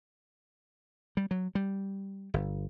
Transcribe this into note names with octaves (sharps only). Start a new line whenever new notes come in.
G3
F#3
G3
G1